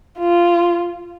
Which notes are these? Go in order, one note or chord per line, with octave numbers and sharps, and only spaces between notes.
F4